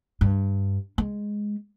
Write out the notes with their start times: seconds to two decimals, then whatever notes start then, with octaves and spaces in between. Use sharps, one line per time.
0.21 G2
0.98 G#3